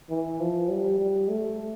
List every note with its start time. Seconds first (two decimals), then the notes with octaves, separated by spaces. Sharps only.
0.10 E3
0.40 F3
0.69 G3
0.99 G3
1.29 A3